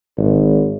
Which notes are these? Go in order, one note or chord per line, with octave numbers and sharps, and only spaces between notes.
G#1